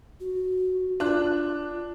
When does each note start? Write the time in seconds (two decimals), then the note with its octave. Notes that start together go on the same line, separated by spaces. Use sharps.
0.20 F#4
1.00 D4 F4 F#6